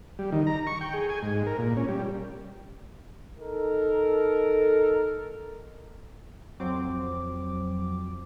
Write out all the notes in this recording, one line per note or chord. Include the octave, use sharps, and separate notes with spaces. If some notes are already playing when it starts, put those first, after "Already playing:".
G3
D#3
A#5
C#6
G5
G#4
G#5
G#2
A#4
A#2
C#4
G3
D#4 A4 A#4
F2 F#3 C4 D6